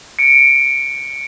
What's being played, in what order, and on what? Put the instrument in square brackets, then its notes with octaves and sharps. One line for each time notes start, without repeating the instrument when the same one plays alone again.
[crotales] C#7 D7